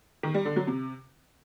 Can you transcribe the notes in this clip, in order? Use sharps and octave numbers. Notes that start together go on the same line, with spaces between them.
D#3
G3
D3
F#3
C3